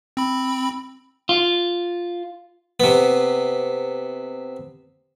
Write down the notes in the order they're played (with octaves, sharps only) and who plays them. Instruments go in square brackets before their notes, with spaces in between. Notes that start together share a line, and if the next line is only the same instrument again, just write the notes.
[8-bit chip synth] C4 B5
[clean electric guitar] F4
[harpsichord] C3 B3